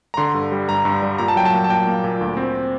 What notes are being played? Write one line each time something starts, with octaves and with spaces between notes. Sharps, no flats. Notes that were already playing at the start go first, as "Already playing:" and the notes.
A#5
D3 C6
G2
G3
G2 A#5
G2
G3
A#2 A#5
A5
F#3 G5
A5
A#3
A5
A#2 G5
A#3
A#2
D2
C4